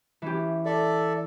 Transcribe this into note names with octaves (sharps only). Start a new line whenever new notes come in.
E3 C#4 G4
A4 D5 E5